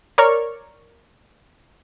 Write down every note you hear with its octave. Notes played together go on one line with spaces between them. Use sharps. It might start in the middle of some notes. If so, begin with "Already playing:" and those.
A#4 C#5 D5 C#6 F6